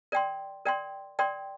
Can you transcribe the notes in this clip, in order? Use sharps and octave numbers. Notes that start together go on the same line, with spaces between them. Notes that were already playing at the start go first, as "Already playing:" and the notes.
A#4 D5 G5 C6
A#4 D5 G5 C6
A#4 D5 G5 C6